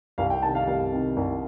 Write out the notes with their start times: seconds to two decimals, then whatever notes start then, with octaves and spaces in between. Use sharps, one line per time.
0.18 C2 F5
0.30 G5
0.43 C3 D#3 A5
0.55 F5
0.67 C2 F5
0.92 C3 D#3
1.17 C2